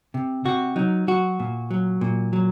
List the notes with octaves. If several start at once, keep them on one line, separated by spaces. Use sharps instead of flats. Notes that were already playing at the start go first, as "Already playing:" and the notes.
C3
C3 F#4
F#3 D#4
F#3 F#4
A#2
F#3
A#2
F#3